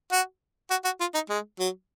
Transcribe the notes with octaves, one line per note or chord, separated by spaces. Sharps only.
F#4
F#4
F#4
F4
D#4
G#3
F#3